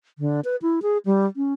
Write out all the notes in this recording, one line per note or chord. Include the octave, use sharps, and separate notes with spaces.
D3
B4
E4
G#4
G3
C#4